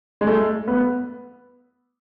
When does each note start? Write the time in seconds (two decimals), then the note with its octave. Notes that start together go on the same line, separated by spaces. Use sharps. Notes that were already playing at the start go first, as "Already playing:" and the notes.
0.21 G#3
0.27 A3
0.68 B3